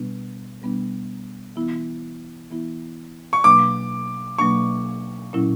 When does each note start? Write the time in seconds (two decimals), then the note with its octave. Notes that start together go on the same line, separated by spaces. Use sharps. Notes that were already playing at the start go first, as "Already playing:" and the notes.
Already playing: B2 G3 B3 D4
0.62 B2 G3 B3 D4
1.56 E3 B3 E4
2.51 E3 B3 E4
3.33 C#6
3.44 B2 F#3 A#3 D4 D6
4.38 B2 F#3 A#3 D4 C#6
5.33 A#2 F#3 C#4 E4